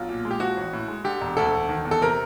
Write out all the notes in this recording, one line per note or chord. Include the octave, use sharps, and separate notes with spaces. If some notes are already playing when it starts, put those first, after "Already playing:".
Already playing: B1 F4
A#2
G#3
G4
F3 F#4
A1
A2
G#3
D3 G4
E1
D2 A4
E1
D#3
E2
A4
C3 A#4